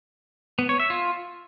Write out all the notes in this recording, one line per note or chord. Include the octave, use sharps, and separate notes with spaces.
B3
C#5
E5
F4